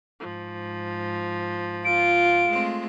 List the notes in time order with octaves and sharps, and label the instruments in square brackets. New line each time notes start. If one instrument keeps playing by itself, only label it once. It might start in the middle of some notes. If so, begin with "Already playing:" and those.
[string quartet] G#2 F3
[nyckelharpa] F4 [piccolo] D7
[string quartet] G#3 A3 C4